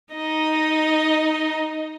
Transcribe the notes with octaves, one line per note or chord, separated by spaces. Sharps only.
D#4 D#5